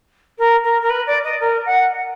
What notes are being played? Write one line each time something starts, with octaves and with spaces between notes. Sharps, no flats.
A#4
A#4
A#4
B4
D5
D#5
A#4
F#5